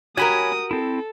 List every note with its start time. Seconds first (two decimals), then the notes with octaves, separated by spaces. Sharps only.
0.17 F#4 G4 A#4 C#5 G#5 B5 D#6
0.71 C4 E4 A4